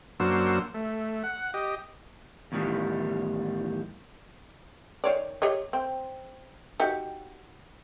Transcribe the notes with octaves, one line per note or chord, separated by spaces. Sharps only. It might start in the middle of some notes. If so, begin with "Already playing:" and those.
F#2 A#3 D4 F#4 C5 E6
A3
F#5
G4 D#5
E2 A2 D#3 G3
D#3 C#5 D5
G4 C#5 D#5
C4
D#4 F#4 G4